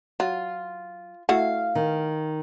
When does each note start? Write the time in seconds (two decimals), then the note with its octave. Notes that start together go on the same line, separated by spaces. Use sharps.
0.20 F#3 F4
1.29 A3 E4 F#4 F5
1.75 D#3